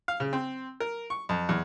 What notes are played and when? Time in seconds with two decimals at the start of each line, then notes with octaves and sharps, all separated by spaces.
0.08 F5
0.20 C#3
0.33 C4
0.80 A#4
1.10 C#6
1.29 F2
1.49 E2